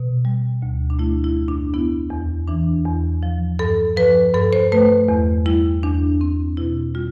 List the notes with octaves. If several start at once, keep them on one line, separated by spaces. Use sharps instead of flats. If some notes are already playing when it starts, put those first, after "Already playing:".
Already playing: B2
G3
D2
D4
A3 E4
E4
F2
D4
B3 E4
E2
E3 D4
E2
F3
G2 A4
F3 B4
G2 A4
C5
A3 B4
E2
G3 E4
E2 D4
C4
B2 E4
G3 F4